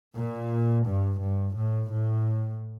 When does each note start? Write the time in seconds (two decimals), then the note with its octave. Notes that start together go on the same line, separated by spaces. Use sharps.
0.16 A#2
0.86 G2
1.21 G2
1.56 A2
1.91 A2